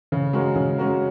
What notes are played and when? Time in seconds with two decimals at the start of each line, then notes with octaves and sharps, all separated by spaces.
0.12 C#3
0.33 G#3 C#4 F#4 A#4
0.56 C#3
0.78 G#3 C#4 F#4 A#4